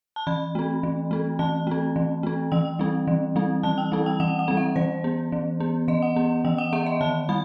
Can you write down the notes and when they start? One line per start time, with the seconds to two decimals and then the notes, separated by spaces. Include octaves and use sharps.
0.16 A5
0.27 E3 B5
0.55 A3 C4
0.83 E3
1.11 A3 C4
1.39 E3 A5
1.67 A3 C4
1.96 E3
2.23 A3 C4
2.52 E3 G5
2.79 G3 C4
3.07 E3
3.36 G3 C4
3.63 E3 A5
3.78 G5
3.92 G3 C4
4.06 G5
4.20 E3 F#5
4.39 F#5
4.48 G3 C4
4.57 E5
4.76 E3 C5
5.04 B3
5.32 E3
5.60 B3
5.88 E3 D#5
6.02 F#5
6.16 B3
6.45 E3 G5
6.58 F#5
6.73 B3 E5
6.86 D#5
7.01 D#3 A5
7.29 G3 B5